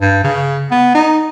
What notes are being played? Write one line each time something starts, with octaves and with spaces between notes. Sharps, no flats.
G2
C#3
B3
D#4